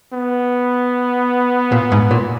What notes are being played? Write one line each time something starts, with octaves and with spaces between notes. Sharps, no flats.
B3
A#2
G#2
A#2